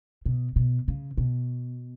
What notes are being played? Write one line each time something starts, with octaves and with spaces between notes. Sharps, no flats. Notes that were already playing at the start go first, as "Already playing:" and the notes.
B2
B2
C#3
B2